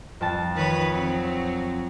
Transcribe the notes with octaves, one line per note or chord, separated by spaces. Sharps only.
F2 A5
D#3 B4 C#5
F#3 C4